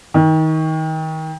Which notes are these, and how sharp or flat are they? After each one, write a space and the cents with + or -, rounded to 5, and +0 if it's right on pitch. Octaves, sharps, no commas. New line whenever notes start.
D#3 +25